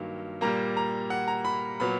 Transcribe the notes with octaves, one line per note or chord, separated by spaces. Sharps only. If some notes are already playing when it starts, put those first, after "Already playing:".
Already playing: G2 D#3 F#3 A#3
A#2 G3 A#3 A#5
A#5
F#5
A#5
B5
A#2 F#3 B3 B5